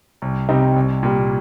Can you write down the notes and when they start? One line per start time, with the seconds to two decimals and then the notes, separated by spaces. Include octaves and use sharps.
0.22 C2
0.49 C3 G3 C4 D#4
0.76 C2
1.03 A#2 G3